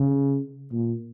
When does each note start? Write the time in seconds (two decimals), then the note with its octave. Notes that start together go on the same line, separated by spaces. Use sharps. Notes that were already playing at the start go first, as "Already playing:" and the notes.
Already playing: C#3
0.72 A#2